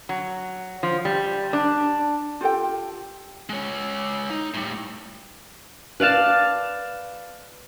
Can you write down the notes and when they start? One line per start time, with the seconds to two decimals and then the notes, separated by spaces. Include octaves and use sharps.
0.09 F#3
0.83 F3
1.05 G3
1.53 D4
2.41 F4 G4 A4 G5
3.49 G#3 C#5
4.30 D#4
4.54 A2 G3
6.00 B4 D5 F5 A5